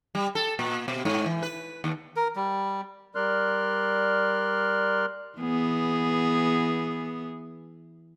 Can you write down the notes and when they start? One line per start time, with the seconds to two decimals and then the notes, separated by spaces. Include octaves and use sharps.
0.15 G3
0.35 A4
0.59 A#2
0.88 B2
1.05 G#2
1.26 E3
1.43 B4
1.84 D#2
2.16 A#4
2.36 G3
3.15 G3 A#4 D5 C6 F6 F#6
5.39 E3 B3 G#4